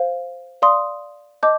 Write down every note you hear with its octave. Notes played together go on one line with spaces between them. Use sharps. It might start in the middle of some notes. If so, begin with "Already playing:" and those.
Already playing: C5 F5
D5 F5 C6 D#6
D#5 A5 D6 G6